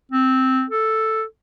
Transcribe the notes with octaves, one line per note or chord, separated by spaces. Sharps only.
C4
A4